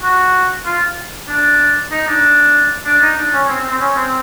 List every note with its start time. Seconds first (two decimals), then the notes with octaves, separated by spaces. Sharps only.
0.03 F#4
0.65 F4
1.28 D4
1.91 D#4
2.07 D4
2.85 D4
3.02 D#4
3.17 D4
3.33 C#4
3.48 C4
3.59 C4
3.70 C4
3.80 C#4
3.96 C4